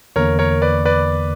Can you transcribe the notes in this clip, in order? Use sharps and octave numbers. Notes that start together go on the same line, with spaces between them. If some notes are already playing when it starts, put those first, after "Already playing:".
E2 D3 A#3 A#4 C#5
A#4 C#5
B4 D5
B4 D5